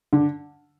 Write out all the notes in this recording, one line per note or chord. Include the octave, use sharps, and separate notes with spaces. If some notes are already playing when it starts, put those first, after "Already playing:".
D3